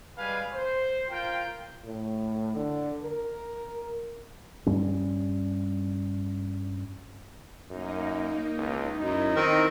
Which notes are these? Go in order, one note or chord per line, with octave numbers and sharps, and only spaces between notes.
G3 G#3 B4 F5 G#5
C5
F4 A#4 G5
A2
D3
A#4
G2 G3 C#4
F#2 A#3 D#4
C#2 D#4
F#2 D#4 E4
D#3 C4 A#4